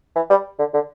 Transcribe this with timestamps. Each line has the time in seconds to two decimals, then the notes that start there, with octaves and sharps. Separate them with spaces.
0.16 E3
0.30 G3
0.59 D3
0.74 D3